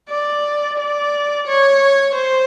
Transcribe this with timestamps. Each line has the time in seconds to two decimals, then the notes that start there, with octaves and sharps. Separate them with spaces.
0.09 D5
0.78 D5
1.47 C#5
2.15 C5